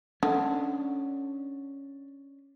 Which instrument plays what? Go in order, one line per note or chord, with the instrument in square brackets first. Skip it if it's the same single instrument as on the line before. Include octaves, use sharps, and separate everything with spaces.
[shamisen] D3 [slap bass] C#4 D4